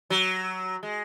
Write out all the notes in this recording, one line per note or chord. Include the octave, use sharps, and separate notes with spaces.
F#3
G#3